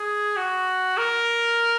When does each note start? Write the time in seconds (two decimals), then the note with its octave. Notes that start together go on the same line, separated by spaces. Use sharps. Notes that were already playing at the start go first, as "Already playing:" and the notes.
Already playing: G#4
0.36 F#4
0.97 A#4